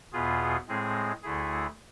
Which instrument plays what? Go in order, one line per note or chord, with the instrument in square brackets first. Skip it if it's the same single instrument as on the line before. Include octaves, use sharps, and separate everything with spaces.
[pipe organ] E2 B2 B3 F4 G#4
A2 G#3 C4 G#4
D2 D3 A3 E4 G#4